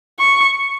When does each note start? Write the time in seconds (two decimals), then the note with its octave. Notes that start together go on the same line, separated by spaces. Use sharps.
0.20 C#6